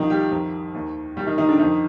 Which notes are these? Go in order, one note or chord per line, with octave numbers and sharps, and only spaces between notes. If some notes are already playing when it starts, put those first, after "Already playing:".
Already playing: C2 C3 D#3 F3 D#4
G3 G4
F2 D#3
D#2 D#3
D#2 D#3 G3 G4
D#3 D#4
D#3 D#4
D3 D4
F2 D#3 D#4